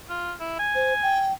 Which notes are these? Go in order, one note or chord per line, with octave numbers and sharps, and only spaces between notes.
F4
E4
G#5
C5
G5